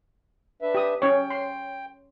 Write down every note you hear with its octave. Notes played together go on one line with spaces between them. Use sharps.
D4 B4 E5
G4 D#6
C#4 C#5 G5
C6